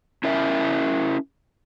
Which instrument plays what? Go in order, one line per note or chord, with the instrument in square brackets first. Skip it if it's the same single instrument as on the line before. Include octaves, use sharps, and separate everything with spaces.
[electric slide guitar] C#4 E4 A#4 E5